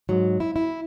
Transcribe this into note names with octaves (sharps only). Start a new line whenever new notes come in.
G#2 F#3
E4
E4